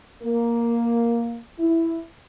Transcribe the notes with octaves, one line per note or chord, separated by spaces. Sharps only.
A#3
E4